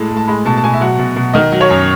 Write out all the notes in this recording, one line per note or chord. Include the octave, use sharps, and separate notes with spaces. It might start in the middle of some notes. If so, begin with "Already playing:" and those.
Already playing: A2 G#3 A5
A2
A5
G#3 B5
B2 A5
A5
B2 G#5
E5
F#3 F#5
B2
B2
D#3 D#5
F#3
C#5
F#2